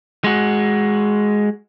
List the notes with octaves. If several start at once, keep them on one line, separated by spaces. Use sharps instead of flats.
G#3 F#4